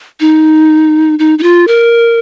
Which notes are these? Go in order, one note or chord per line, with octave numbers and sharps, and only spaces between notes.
D#4
D#4
D#4
F4
A#4